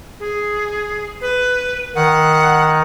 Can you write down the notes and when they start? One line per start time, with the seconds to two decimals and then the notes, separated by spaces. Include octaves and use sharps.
0.20 G#4
1.21 B4
1.95 D#3 F#5